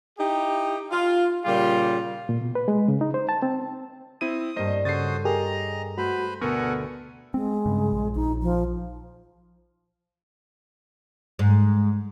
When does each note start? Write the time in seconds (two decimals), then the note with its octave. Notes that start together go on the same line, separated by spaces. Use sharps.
0.19 D#4 E4 G4
0.91 F4
1.45 A#2 C#3 G3 F4 G4
2.29 A#2
2.41 B2
2.55 B4
2.68 G#3
2.88 C#3
3.01 D#4
3.14 C5
3.29 A5
3.42 C4
4.21 C4 E4 D#6 D#7
4.56 G2 A#3 C5 D#5
4.85 C#3 F#4 A4 C5 C#5 D#6 A6 C7
5.25 G4 G#4 A#4 D#5 A#5
5.97 A3 F#4 B4 C5 B5
6.41 D2 B2 B3 A4 A#4 F#5 G#5 C#6
7.34 G#3 C4
7.66 G2 C#3
7.92 A#1
8.16 A#1 D#4
8.42 F3
11.39 G#2